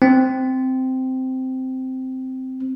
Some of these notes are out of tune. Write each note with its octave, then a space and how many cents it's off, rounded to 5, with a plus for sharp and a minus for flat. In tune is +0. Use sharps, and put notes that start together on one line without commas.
C4 -10